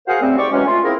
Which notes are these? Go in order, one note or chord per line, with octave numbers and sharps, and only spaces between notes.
F#4 G#4 A#4 C5 F5 F#5
C#3 G3 A3 C4
G#2 C4 G4 D5 C#6
E3 F#3 G#3 C#4
A3 F4
A#3 C4 E4 G#4 A#4